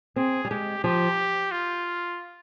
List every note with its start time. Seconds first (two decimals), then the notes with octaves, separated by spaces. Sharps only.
0.16 C4 G#4
0.45 G3
0.50 G#3 G4
0.84 F3 G4
1.51 F4